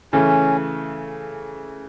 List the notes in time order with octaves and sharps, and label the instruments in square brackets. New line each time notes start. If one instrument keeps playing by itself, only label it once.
[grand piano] C#3 E3 A3 [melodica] C#4